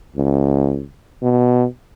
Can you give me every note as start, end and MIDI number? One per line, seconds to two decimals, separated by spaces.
0.16 0.84 37
1.22 1.65 47